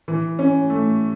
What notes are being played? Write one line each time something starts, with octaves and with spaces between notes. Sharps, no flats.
E3
C#4
A3